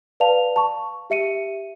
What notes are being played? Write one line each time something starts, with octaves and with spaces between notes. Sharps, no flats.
B4 D5 F5 A5 F7
A5 C#6
G4 E5 C#7 D#7